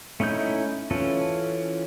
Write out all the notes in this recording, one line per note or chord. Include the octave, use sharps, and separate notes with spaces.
A3 C#4 D#4 E4 G6
E3 C#4 F4 A4